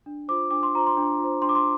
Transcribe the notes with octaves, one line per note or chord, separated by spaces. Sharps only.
D4
F4 C5 D6
D4 D6
C6
F4 C5 A#5
C6
D4
F4
C5
D4 C6
D6
C6